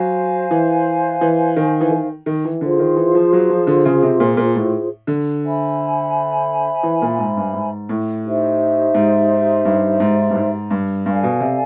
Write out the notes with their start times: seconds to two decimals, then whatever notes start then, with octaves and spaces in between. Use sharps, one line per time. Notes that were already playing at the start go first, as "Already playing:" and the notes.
Already playing: F#3 C5 F5 G#5
0.51 E3
1.21 E3
1.56 D#3
1.81 E3
1.91 D#3
2.26 D#3
2.45 E3
2.61 D3 F4 G#4 C5
2.79 D#3
2.97 E3
3.15 F3
3.33 F#3
3.50 F3
3.67 D3
3.85 C#3
4.02 C3
4.20 A#2
4.37 A#2
4.56 A2
5.07 D3
5.43 C5 E5 G#5 B5
6.83 E3
7.02 A#2
7.19 G#2
7.37 G2
7.54 G#2
7.89 A2
8.24 D#4 G4 C5 E5
8.94 G#2
9.65 G2
10.00 G#2
10.30 G2
10.35 G#2
10.71 G2
11.05 G2 A4 D5 F5 G#5
11.23 B2
11.40 C3